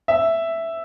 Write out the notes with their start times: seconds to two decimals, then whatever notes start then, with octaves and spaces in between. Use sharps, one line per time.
0.08 E5